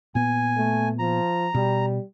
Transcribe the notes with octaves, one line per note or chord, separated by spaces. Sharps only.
A#2 B3 G#5
A3
F3 A#5
B2 G3